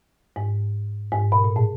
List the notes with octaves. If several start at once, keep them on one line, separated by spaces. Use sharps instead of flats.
G#2
G#2
B2
A#2
A2